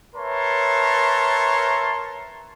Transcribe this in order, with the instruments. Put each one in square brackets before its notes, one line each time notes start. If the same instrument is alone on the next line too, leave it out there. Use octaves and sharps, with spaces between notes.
[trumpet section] A#4 B4 C#5 E5 A5 C6